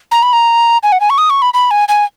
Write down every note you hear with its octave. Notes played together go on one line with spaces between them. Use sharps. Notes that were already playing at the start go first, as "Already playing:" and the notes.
A#5
B5
A#5
G#5
F#5
G#5
C#6
D#6
C#6
B5
B5
G#5
G#5